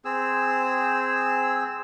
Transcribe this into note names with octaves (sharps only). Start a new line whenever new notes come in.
C4 G#4 E6